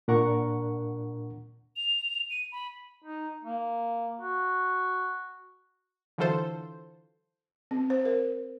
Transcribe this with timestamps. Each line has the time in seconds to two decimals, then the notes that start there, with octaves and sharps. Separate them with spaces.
0.08 A#2 D4 A#4 F#5 A#5 C#6
1.76 F7
2.30 D#7
2.52 B5
3.03 D#4
3.44 A#3
4.20 F#4
6.18 D3 E3 F#3 F4 A4 C5
7.71 C4
7.90 C5
8.05 A#4